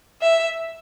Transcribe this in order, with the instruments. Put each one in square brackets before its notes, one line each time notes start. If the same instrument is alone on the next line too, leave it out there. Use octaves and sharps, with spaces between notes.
[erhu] E5